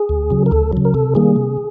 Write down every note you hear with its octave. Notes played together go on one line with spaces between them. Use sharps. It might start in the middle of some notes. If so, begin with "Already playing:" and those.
Already playing: G#4
D2
C#3 F#3
A#4
D2 A4
C#3 F#3
A#4
C3 A4
D#3 G3 A#3 G#4
C3